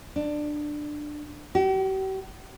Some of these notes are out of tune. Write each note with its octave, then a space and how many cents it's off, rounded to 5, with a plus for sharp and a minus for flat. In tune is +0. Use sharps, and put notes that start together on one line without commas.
D4 +15
G4 -45